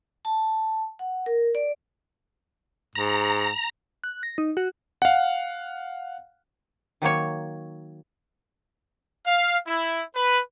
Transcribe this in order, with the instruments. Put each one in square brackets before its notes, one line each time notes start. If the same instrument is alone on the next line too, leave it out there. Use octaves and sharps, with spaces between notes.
[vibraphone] A5
F#5
A#4
D5
[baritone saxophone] G#2 [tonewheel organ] A#5
[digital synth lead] F#6
A#6
D#4
F#4
[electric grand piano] F5 F#5
[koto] D#3 F#3 A#3 C#5
[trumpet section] F5
E4
B4